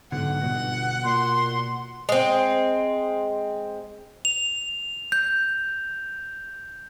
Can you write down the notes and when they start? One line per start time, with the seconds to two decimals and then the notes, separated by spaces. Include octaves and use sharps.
0.12 B1 G#2 D3 F#5
0.42 G1 B2 F#4
1.04 A#2 C6
2.09 G#3 C4
4.25 F7
5.12 G6